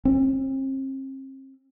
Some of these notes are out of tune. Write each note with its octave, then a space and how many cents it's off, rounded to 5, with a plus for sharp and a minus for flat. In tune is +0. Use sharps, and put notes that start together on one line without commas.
C4 +40